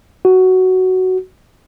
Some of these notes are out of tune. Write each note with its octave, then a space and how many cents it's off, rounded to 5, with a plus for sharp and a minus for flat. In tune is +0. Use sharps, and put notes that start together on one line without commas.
F#4 +10